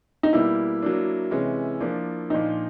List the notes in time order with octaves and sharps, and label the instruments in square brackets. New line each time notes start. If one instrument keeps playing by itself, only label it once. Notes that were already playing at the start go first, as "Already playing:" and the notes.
[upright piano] D#4
[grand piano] B2 G3 A#3 [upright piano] E4
[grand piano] F#3 A#3 D4
C3 E3 G#3 C#4
F3 A#3 D4
[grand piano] A#2 F3 A#3 D4 [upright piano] D#4